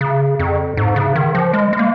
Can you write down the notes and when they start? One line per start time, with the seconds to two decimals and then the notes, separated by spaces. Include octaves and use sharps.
0.01 C#3
0.39 F2
0.77 G#2
0.96 C#3
1.15 D#3
1.35 F3
1.53 G#3
1.73 G#3
1.79 A#3